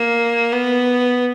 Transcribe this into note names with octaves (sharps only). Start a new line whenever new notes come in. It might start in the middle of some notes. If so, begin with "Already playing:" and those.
Already playing: A#3
B3